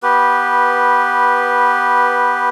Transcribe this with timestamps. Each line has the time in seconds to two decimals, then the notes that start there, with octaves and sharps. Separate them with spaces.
0.03 B3 G4 B4